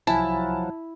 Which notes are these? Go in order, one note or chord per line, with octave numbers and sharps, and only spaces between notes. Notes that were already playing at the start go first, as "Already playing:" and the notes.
C2 F3 F#3 E4 G#5 A5 B5